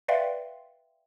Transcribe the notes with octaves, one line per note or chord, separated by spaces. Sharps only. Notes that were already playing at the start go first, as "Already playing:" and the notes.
B4 D5 E5 F5 G5 C6